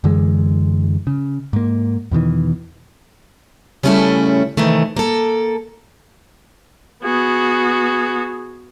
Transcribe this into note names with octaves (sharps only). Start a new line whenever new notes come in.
F#2 D3 E3 G#3
C#3
G#2 A#3
E2 B2 D#3 E3
C#3 G3 A3 C#4 E4 A4
C3 D#3 E3 A3
A#3 A4
B3 F#4 G#4